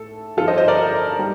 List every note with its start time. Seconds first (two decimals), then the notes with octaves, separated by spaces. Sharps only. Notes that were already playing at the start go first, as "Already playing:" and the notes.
Already playing: A2 A4
0.37 G2 D3 F3 F4 A4
0.48 C5 D#5
0.58 C5 D#5
0.68 A#4 D5
1.19 G3